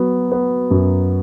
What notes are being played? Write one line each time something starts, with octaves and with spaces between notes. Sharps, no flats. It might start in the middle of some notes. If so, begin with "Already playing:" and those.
Already playing: F#3 B3
B3
F#2